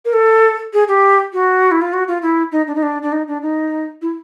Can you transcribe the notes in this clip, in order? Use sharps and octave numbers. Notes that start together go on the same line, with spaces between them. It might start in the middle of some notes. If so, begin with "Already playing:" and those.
A#4
A4
G#4
G4
F#4
E4
F4
F#4
F4
E4
D#4
D4
D#4
D4
D4
D#4
D4
D#4
E4